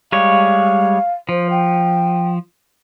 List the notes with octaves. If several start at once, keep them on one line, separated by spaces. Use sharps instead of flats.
G3 G#3 C#5 F5
F3 C5
G5